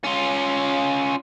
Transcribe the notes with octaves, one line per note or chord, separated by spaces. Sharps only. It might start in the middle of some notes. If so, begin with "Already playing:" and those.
C#4 F4